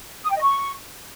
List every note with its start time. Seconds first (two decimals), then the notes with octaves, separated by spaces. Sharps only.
0.25 D#6
0.31 G5
0.37 D#5
0.43 C#6